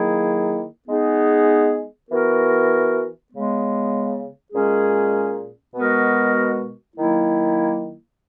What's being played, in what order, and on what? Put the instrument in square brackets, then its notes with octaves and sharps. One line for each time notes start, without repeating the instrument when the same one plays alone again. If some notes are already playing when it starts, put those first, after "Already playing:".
Already playing: [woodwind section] D#3 F#3 A#3 E4 G#4
G#3 B3 D#4 G#4
E3 B3 F#4 A#4
C#3 G#3 B3
A#2 G#3 C#4 G#4
B2 G#3 B3 F#4 A#4
D#3 F#3 A#3 E4